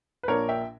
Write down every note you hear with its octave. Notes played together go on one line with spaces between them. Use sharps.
B4
A#1 A#2 A#3 D4 A#4 C#5
E5 G5